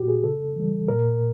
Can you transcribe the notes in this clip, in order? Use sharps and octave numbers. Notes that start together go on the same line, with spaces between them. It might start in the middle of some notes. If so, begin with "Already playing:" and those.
Already playing: A#2 F#4 G4
G#4
C#3 A4
E3 G3
A#2 A#4